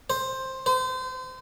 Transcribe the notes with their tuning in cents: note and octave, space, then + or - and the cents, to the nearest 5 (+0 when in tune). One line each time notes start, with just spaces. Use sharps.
C5 +10
C5 -30